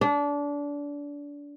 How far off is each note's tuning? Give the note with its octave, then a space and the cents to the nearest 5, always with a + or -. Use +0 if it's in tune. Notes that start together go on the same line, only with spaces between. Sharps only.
D4 -25